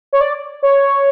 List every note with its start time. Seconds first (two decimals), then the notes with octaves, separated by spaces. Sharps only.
0.13 C#5
0.21 D5
0.63 C#5